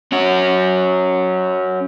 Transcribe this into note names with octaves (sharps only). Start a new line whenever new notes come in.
C#4 F#4